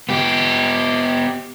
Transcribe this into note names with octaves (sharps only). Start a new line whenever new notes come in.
B3 G4